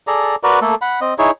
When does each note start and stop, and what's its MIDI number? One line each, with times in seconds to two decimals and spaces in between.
0.07 0.36 68
0.07 0.36 69
0.07 0.36 74
0.07 0.36 82
0.43 0.59 66
0.43 0.59 70
0.43 0.59 71
0.43 0.59 74
0.61 0.75 57
0.61 0.75 58
0.61 0.75 69
0.81 1.00 78
0.81 1.00 83
1.01 1.14 60
1.01 1.14 75
1.18 1.31 63
1.18 1.31 64
1.18 1.31 68
1.18 1.31 73